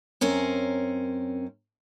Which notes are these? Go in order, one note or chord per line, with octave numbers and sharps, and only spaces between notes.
F#2 C4 C#4 A#4